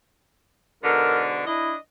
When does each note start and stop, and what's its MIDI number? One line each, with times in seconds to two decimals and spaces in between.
0.84 1.43 44
0.84 1.43 47
0.84 1.43 50
0.84 1.22 70
1.46 1.75 62
1.46 1.72 64
1.46 1.75 75